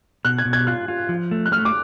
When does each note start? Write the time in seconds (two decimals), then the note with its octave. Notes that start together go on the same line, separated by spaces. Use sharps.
0.25 B2 F#6
0.38 G#6
0.45 B2
0.53 G#6
0.67 F4 F#6
0.88 F4
1.09 F3
1.31 A3
1.46 F#6
1.52 A3 F6
1.65 D6